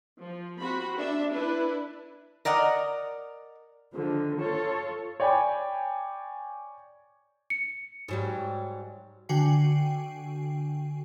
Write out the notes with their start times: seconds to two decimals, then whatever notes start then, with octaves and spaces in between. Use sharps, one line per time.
0.21 F3
0.62 C4 F#4 B5
0.99 D4 E5
1.32 D4 E4 B4
2.45 A#4 D5 D#5 F#5
3.93 D3 D#3 F3
4.39 F4 A4 C#5
5.20 C#5 D5 G5 G#5 B5
7.50 C#7
8.08 G#2 F#3 G3
9.29 D3 F#4 G5 G#5 C7